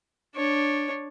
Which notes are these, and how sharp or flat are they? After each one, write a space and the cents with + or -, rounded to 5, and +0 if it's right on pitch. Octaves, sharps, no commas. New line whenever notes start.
D4 +0 C#5 -5